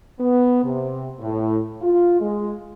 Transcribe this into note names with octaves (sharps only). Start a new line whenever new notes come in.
B3
C3
A2
F4
G#3